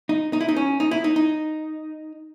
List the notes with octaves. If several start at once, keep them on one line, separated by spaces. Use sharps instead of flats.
D#4
D#4
E4
D#4
C#4
D#4
E4
D#4
D#4